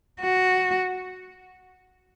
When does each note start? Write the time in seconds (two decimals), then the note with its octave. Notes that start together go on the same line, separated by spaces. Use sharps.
0.21 F#4